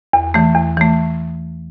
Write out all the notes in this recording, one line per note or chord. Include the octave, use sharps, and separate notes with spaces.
E2
E3 A3
E2
E3 A3